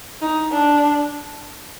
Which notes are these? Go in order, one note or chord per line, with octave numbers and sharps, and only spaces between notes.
D#4
D4